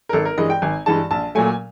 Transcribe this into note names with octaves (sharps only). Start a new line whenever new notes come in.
A#4
G#1 A4
A#4
G2 E3 G#3 D#5
G5
G#1 G#5
G2 E3 G#3 A5
A#1 A5
A#2 F#3 A3 G#5